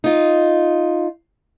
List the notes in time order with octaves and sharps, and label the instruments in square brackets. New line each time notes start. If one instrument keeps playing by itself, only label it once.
[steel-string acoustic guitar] D#4 F4